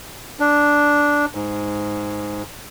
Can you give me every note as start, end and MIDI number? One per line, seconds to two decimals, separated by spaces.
0.40 1.26 62
1.35 2.43 44